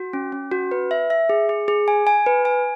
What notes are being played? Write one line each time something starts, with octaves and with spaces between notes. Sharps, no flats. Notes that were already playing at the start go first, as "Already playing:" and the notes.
Already playing: F#4
C#4
C#4
F#4
B4
E5
E5
G#4
G#4
G#4
G#5
G#5
B4
G#5